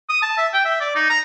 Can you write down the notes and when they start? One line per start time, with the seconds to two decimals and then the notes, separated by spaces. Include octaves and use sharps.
0.09 D#6
0.22 A5
0.38 E5
0.53 G5
0.65 E5
0.81 D5
0.95 D#4
1.10 A#5